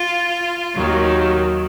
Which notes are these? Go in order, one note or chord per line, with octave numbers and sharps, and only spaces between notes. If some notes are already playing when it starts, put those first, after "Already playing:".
Already playing: F4
D#2 D#3 F#3